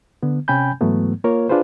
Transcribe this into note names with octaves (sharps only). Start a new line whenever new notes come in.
D3 B3
C3 C#4 G5 G#5 B5 G6
G#2 E3 F#3 A3 B3
A#3 F4 A#4 C#5
D4 F4 G#4 B4 C5